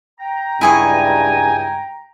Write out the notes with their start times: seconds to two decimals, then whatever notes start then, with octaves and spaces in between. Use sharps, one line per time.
0.20 G5 A#5
0.61 C#2 G2 E4 G#4 G#5 C#6